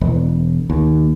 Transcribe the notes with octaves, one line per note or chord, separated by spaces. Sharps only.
E1
D#2